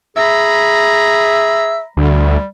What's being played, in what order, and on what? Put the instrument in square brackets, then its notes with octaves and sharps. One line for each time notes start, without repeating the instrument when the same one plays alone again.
[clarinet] G#4 [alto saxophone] E5 [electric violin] A#5 B5
[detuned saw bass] D2 [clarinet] G3